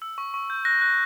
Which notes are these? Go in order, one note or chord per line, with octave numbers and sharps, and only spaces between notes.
E6
C#6
C#6
G6
F#6 A#6
F#6